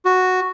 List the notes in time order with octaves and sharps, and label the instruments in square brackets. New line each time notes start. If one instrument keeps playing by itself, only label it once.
[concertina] F#4